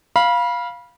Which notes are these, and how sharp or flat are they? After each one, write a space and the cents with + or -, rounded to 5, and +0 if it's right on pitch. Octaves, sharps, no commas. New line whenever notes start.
F5 +0 B5 -25